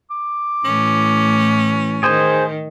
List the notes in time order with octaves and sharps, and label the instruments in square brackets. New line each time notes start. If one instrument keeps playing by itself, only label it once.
[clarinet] D6
[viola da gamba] A2 E3 A3 [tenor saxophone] C#4
[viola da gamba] D#3 [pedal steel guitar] G#4 C5